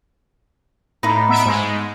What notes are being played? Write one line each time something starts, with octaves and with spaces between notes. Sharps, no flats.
A2 D#4 A#5 B5
B3 E5 D7
G#2 G#3